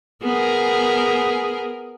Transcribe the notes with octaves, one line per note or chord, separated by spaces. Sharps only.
B3 G#4 A#4